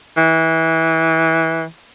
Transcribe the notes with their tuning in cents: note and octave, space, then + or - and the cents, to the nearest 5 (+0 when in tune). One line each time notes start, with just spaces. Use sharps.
E3 -20